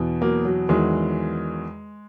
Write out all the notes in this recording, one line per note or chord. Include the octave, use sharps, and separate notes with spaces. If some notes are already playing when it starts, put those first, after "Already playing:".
Already playing: E2 B2
F#3 A#3
F#3
E2 D#3 F#3 G#3